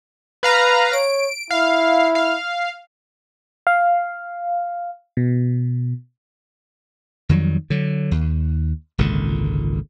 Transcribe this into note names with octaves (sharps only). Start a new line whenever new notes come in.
B4 F5 A#5
C#5 D7
E4 F5
F5
F5
B2
F2 D#3 F#3 G3
D3 F#3
D#2
G#1 C#2 A#2 D3